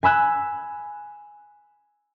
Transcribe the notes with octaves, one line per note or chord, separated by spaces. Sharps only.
G#5 B5 E6 F#6